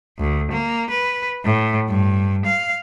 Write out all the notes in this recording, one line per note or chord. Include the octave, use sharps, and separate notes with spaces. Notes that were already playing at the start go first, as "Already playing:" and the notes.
D2
A#3
B4
A2
G2
F5